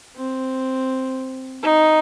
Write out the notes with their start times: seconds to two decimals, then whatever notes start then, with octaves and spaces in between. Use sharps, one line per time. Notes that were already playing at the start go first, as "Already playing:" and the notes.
0.17 C4
1.63 D#4